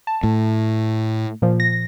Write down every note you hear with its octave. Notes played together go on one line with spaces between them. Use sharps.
A5
A2
A#2 F3
A#6